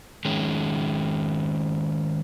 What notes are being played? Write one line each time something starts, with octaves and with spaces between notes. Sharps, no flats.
D#3 G#3 C#4